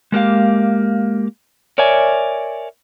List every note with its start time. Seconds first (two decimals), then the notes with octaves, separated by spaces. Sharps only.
0.12 G#3 A#3 G4 F5
1.78 A#4 C#5 D5 E5 G#5